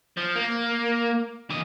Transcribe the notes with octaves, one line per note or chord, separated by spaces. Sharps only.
F3
A#3
E3 D#5